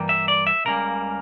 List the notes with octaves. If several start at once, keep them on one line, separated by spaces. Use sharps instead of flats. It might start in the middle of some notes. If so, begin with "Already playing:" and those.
Already playing: G2 E3 G3 A#3
E5
D5
E5
C#2 C#3 G3 A#3 A#4